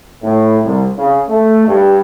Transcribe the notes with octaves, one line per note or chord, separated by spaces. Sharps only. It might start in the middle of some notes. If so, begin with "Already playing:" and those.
A2
C2
C#3
A3
G2